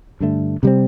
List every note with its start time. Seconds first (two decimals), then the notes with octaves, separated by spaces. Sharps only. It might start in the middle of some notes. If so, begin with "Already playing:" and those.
0.20 G2 D3 A3
0.63 C3 G3 C4